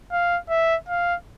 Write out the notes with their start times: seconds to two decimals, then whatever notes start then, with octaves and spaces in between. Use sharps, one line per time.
0.12 F5
0.50 E5
0.89 F5